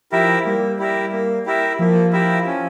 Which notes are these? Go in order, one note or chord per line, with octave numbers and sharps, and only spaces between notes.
F3 E4 G4 A#4 E5
G3 A#3
E4 G4 A#4 E5
A#3
E4 G4 A#4 E5
F3 A#3
E4 G4 A#4 E5
C#4